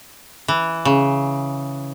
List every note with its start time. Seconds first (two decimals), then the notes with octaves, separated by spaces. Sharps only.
0.48 E3
0.85 C#3